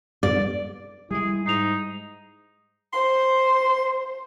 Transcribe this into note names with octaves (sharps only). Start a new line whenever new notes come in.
D5
G3 G#3 E4 G#4
G#2 D#4 C7 F7
C5 C6